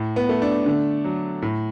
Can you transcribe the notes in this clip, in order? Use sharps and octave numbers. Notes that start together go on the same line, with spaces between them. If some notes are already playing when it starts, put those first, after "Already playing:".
Already playing: A2
B3
A3
D4
D3
F#3
A2